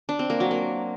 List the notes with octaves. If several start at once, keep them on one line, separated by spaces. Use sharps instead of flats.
D4
C4
A#3
F#3
A#3